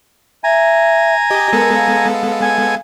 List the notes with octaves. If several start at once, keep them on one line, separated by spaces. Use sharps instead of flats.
E5 G#5 A#5
G4 D#5
G#3 B3 A4 A#4
F5
G#5